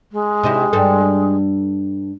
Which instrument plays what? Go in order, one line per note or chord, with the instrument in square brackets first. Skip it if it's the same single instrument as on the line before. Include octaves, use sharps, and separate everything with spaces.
[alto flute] G#3
[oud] C3 D#4 E4
G2 G3 A4